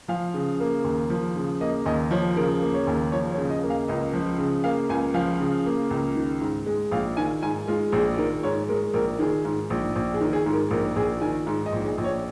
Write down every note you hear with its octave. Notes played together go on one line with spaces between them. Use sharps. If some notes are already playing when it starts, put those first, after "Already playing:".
F3 F5
C#3
A#3
D#2
F3
C#3
A#3 D#5
D#2 D#5
F3 C#5
C#3 A#4
A#3
C#5
D#2
F3 C#5
C#5
C#3
D#5
A#3
F5
C#2 D#5
F3
C#3
A#3 F5
C#2 G#5
F3 F5
C#3
A#3
C#2
D#3
G#2
G#3
A#1 F5
D#3 G#5
G#2 G#5
G#3 F4
A#1 G#4
D#3 A#4
G#2 C#5
G#3 A#4
A#1 A#4
D#3 G#4
G#2
A#1
A#1
G#4
D#3
G#4
G#2
A#4
A#1 A#4
A#1 G#4
D#3 G#5
G#2
D#5
A#1
G#4
A#1
C#5